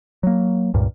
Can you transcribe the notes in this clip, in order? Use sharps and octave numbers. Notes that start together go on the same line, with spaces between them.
F#3 A#3
C#2 G2 A#2